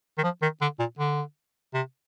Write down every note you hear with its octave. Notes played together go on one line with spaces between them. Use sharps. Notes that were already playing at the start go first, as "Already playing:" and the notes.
D#3
F3
D#3
D3
A#2
D3
C3